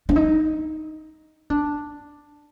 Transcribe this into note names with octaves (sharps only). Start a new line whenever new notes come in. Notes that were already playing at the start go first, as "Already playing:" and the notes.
D4
D#4
D4